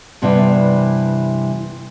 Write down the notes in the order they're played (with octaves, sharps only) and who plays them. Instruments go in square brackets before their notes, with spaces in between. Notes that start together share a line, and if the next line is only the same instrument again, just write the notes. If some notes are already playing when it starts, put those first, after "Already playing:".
[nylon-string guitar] G2 C3 E3 G3 B3 E4